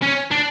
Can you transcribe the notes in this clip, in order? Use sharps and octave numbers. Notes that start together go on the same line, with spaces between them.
C#4
D4